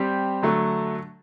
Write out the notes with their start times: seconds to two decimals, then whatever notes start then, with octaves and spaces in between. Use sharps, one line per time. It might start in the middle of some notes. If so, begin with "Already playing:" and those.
Already playing: G3 C4 G4
0.43 D3 F#3 A3